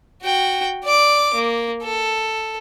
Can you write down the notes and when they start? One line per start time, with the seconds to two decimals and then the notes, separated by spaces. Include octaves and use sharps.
0.23 F#4 G5
0.85 D5 D6
1.35 A#3
1.83 A4